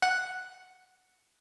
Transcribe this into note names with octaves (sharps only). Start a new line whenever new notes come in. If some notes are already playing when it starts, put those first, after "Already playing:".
F#5